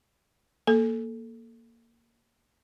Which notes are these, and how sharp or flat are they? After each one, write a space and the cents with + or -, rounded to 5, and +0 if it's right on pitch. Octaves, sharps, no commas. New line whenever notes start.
A#3 +0 A4 -5